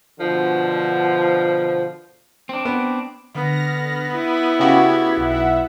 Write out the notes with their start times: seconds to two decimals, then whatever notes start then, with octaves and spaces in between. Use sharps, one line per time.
0.20 B2 D3 F3
2.49 C4 D4
2.65 B3
3.35 D3 B3 F6 A#6
4.15 E4 D#7
4.60 C#3 F#4 G4 G#6
5.15 B1 E5 F#5